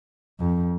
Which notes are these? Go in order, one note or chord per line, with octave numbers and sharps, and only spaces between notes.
F2